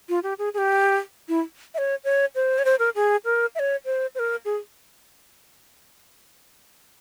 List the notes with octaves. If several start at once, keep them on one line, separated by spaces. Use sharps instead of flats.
F4
G4
G#4
G#4
G4
E4
E5
C#5
C#5
C5
C#5
C5
A#4
G#4
A#4
E5
C#5
C5
C5
A#4
G#4